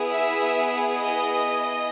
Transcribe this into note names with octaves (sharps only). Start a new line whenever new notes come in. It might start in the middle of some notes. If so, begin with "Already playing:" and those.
Already playing: B3 E4 G#4
E5
D#5